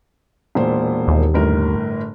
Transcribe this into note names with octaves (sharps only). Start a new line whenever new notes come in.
E1 A#2 C5
D#2
G1 A2 A#4